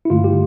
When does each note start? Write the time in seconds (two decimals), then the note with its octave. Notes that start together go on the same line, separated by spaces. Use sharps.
0.05 E4
0.10 G2 D3 A3 F4
0.24 G4